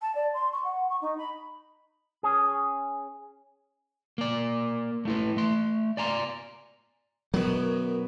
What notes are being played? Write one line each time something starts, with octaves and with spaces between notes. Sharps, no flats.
A5
D5
C6
C#6
F#5
C#6
D#4
B5
C#4 G#4
A#3 D5
A3 E4 B4
A3 C6
D5 G#5 A#5 C6
F#2 B2 D#3 F#3 B3